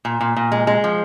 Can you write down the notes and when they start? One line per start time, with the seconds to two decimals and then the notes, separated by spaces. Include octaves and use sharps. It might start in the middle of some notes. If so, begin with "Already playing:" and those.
0.05 A#2
0.21 A#2
0.37 A#2
0.52 G#3
0.67 G#3
0.84 F3